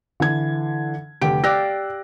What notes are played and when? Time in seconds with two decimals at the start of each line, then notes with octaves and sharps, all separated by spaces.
0.20 D3 E3 G#6
1.22 F1 D3 G4 D7
1.44 G4 D5 F5 E6 F#6 A#6